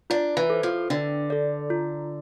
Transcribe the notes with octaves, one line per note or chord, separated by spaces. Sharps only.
D4 F4
E3
A4 C5
F3
D3 D4
A4 D5
F4